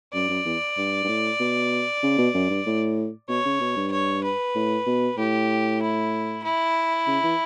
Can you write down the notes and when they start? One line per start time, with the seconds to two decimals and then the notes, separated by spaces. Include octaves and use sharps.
0.14 F#2 D5
0.29 F#2
0.45 E2
0.77 G2
1.04 G2
1.08 A2
1.40 B2
2.03 C#3
2.18 B2
2.34 F#2
2.50 G2
2.66 A2
3.29 B2 C#5
3.45 C#3
3.61 B2
3.76 G2
3.92 C#5
4.24 B4
4.55 A2
4.87 B2
5.18 A2 G4
5.82 E4
6.44 E4
7.07 C#3
7.23 E3